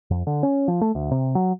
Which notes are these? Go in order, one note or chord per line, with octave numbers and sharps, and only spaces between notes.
F2
D3
C#4
F3
A3
D2
C3
F#3